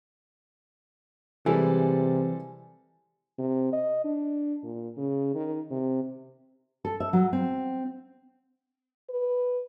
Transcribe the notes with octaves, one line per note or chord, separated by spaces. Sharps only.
C3 E3 G3 G#3 A4 G#5
C3
D#5
D4
A#2
C#3
D#3
C3
A4
E5
F#3
C4
B4